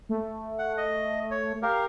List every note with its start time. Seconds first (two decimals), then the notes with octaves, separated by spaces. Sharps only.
0.09 A3
0.59 F#5
0.77 D#5
1.31 C#5
1.62 G4 A#4 F5